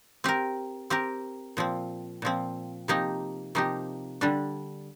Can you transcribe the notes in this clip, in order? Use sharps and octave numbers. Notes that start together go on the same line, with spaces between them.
C4 G4 A#4
C4 G4 A#4
A#2 F3 C4
A#2 F3 C4
C3 F3 A#3 D#4 G4
C3 F3 A#3 D#4 G4
D3 G3 D4